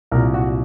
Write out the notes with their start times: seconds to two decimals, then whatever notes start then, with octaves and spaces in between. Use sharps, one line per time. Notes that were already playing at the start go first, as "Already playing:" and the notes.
0.11 C2 A#2 F#3 A#4
0.34 F#4